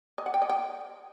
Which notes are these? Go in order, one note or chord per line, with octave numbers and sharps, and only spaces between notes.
D#5
F#5
G5
D#5
G5